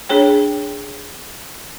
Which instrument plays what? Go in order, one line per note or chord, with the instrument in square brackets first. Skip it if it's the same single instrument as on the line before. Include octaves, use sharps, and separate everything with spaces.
[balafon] D4 G#4 C#5 G5